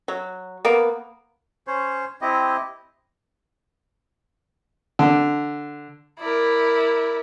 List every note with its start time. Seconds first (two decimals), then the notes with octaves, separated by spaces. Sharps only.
0.08 F#3
0.65 A#3 B3
1.67 C#4 C5 C#5
2.21 C4 E4 G4 D#5
4.99 D3
6.20 E4 A#4 D5